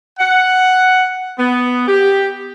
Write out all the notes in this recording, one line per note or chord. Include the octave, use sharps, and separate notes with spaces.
F#5
B3
G4